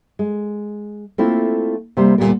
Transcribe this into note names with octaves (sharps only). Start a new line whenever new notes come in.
G#3
A3 A#3 C4 E4 F4
C3 G3 A#3 C5
D2 A#2 F3 G3 B3 A#4